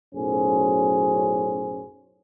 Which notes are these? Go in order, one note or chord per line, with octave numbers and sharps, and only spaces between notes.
B1 F#2 A2 C#4 G#4 C5